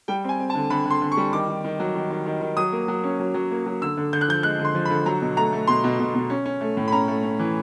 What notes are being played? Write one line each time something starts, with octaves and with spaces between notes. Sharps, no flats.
G3 G5
C4 G#5
C4
A5
D3
D3 B5
D3 C6
D3
C#6
G3
D#3 D6
D#3
D#3
F#3
D#3
D#3
D#3
D#3
F#3 D#6
A#3
F#3
C#4
F#3
F#3
A#3
F#3
D3 E6
D3
D3 G6
F#6
F3 G6
G#3 F#6
D3
C6
F3
B5
D3
F#3 A#5
B2
A3 A#5
A3
B2 C6
B2
B2
B2
C#4
C#4
A3
A2
B5
C#4 A#5
A3
C#4
E3